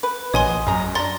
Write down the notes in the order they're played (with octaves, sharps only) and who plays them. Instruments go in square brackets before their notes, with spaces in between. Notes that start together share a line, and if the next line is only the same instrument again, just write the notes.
[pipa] B4
[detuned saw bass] A#1 [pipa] F#4 D#5 [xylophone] C#5 G#5 C6
[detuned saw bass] F#2 [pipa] G#3 A#5
[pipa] D4 A#5 [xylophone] C6 A6